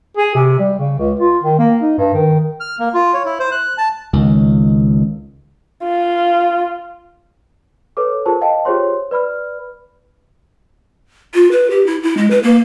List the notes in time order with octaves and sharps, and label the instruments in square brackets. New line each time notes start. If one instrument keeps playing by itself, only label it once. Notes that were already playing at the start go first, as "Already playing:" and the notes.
[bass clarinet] G#4
C3
G3
C#3
C#2
F4
D#3
A#3
D#4
G2
D#3
[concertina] F6
A#3
F4
C#5
E4
C5
F#6
A5
[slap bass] C#2 D#3
[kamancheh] F4
[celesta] A4 B4 C#5 D6
F4 G#4 A#4 C5 A5
D#5 F5 G5 A5
F4 G4 G#4 C5 C#5 C6
B4 D5 B5 F6
[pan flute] F4
B4
G4
E4
E4
G#3
B4
A#3